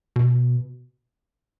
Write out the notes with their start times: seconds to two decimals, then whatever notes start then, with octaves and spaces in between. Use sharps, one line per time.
0.16 B2